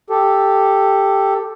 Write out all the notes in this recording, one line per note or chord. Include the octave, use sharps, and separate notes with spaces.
G4 A4